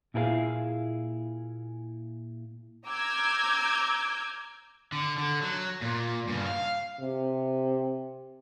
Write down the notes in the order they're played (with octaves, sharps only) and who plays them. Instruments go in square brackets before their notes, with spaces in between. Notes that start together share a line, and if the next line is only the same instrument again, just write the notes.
[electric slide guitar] A#2 E4 G#4 A4 F5
[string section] A#5 D6 E6 F6 G6 G#6
[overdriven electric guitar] D3
D3
F#3
A#2
G2 C#3
F5
[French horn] C3